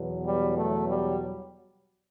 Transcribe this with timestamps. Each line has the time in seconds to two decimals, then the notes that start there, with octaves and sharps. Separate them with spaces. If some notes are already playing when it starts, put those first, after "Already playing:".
Already playing: E2 B2 F#3
0.24 G3
0.55 A3
0.87 G3